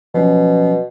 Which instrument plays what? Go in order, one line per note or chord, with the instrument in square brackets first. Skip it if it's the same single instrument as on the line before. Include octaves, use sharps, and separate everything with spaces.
[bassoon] B2 [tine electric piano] F3 F#3 C#4